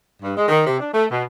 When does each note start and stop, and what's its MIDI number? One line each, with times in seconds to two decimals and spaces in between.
0.23 0.36 43
0.36 0.46 56
0.48 0.62 51
0.67 0.80 48
0.80 0.88 62
0.93 1.05 57
1.10 1.21 47